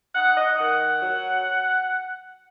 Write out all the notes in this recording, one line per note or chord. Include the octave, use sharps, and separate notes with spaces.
D#4 F#5
D#5
D#3 F#5
F#3